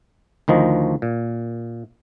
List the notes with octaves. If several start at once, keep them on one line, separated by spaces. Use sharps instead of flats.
D2 D#3 F3 D#5
A#2